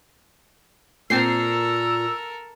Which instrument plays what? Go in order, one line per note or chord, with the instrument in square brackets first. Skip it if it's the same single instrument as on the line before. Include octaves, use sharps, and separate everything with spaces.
[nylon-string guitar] A#2 [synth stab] C4 C7 [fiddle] A4 A#4 [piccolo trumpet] E6